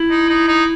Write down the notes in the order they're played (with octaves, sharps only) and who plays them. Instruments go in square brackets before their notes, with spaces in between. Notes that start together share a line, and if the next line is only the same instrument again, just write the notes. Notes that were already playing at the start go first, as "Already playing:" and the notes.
Already playing: [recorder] E4
[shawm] D#4
D#4
D#4